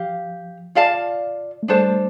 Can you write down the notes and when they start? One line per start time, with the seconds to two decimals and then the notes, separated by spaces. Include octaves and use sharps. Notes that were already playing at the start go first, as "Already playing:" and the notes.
Already playing: F3 G4 F5
0.75 F4 D5 F5 A5
1.63 A3
1.68 G3 D4 A4 C5 A5